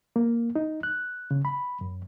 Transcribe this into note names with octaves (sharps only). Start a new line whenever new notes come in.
A#3
D#4
F#6
C#3
B5
F#2